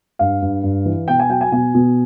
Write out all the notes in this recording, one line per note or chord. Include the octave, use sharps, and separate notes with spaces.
G2 F5
G2
G2
E3
B2 G5
G#5
F#3 G5
G#5
B2 G#5
B2